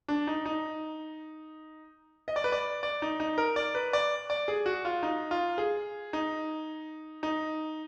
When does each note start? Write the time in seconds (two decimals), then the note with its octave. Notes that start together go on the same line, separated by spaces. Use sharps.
0.08 D4
0.27 D#4
0.46 D#4
2.28 D#5
2.36 D5
2.44 B4
2.52 D5
2.83 D5
3.02 D#4
3.20 D#4
3.38 A#4
3.56 D5
3.75 B4
3.93 D5
4.30 D5
4.48 G#4
4.66 F#4
4.85 F4
5.03 D#4
5.31 F4
5.58 G#4
6.13 D#4
7.23 D#4